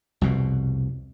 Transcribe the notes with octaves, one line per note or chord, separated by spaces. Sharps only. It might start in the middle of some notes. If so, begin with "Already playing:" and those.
C2 F2 B2